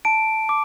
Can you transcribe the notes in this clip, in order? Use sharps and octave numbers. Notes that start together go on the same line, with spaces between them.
A5 D7
D6